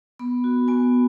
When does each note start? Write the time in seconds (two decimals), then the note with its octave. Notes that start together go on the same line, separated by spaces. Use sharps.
0.19 B3 B5
0.44 F#4
0.68 B3 G#5